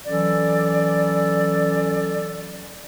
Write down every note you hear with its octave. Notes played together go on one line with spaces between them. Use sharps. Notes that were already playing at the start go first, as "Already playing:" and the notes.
E3 F#3 C#4 A4 D5